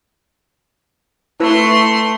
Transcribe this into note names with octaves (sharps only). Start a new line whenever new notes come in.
A3 E4 B4 C6 E6